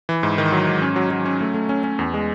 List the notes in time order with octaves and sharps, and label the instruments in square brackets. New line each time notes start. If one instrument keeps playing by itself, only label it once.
[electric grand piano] E3
G#2
D#3
F#3
G#2
C#4
F#3
F#3
C#4
A3
A3
C#4
C#4
E2
G#3